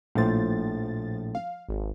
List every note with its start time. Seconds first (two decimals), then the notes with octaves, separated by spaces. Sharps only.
0.15 A#1 A2 F3 C5 A6
1.35 F5
1.69 G#1